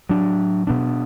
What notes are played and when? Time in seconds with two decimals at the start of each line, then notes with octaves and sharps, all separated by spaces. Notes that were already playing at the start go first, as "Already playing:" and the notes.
0.09 A2 F#3 D4
0.67 B2 B3 D4